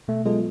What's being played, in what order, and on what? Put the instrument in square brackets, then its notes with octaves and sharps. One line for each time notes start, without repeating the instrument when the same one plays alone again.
[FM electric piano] B2 [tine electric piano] A3
[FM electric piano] F#3 B3 F4 A4 [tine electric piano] G#3